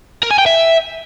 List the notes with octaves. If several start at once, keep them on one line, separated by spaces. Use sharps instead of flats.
A#4
G#5
G5
E5